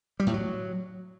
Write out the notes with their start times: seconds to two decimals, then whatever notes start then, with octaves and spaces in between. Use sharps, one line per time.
0.20 G3
0.27 A2
0.34 F#3